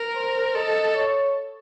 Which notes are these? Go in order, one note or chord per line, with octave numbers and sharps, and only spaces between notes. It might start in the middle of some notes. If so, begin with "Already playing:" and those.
Already playing: A#4
C5
A4 D#5
C#5